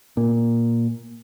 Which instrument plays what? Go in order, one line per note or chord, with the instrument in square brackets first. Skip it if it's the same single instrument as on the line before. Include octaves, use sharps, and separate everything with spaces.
[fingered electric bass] A#2